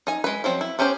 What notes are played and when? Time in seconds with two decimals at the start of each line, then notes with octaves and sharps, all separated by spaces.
0.07 D#4 G#5
0.24 G#3 B4
0.44 F3 F#3 C4
0.61 E4
0.79 B3 C#4 G4 A#4 C5